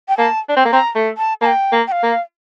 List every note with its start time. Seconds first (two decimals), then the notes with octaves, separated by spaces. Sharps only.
0.08 G5
0.18 A#3 A5
0.49 D4
0.56 C4
0.65 A#3
0.71 C4 A#5
0.95 A3
1.18 A5
1.41 A#3 A5
1.46 G5
1.72 A#3
1.87 G5
1.92 F5
2.03 A#3